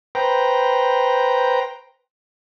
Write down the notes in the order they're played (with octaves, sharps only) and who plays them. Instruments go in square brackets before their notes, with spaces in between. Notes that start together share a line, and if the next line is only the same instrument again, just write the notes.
[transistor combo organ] B4 C5 G5 A#5